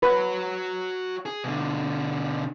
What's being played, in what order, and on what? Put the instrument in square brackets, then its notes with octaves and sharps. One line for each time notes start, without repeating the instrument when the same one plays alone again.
[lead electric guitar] F#4 C#5 [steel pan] B4
[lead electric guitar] G#4
B2 D3